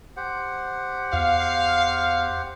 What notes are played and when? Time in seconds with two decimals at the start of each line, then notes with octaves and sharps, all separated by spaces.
0.17 G4 C5 F#5
1.13 E2 F5